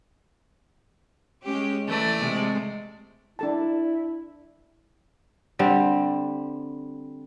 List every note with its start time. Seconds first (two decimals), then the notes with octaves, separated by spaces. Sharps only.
1.45 G#3 C#4 G4
1.88 E3 A3 D5
2.20 C3 G#3
3.39 D4 E4 A4 A5
5.59 D3 G3 C4